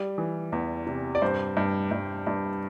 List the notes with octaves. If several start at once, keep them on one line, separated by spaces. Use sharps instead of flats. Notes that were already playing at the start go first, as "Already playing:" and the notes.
Already playing: G3
E3
E2
C3
D5
G2 C5
G2
G2
G2